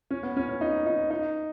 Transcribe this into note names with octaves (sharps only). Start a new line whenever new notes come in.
C#4
B3
C#4
C#4
D#4
D#4
D#4